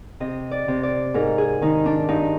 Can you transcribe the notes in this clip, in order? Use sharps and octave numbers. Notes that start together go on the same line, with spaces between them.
C3 D#5
D5
C3
D5
G#2 A#4
G#4
D#3 D#4
D4
G2 D#4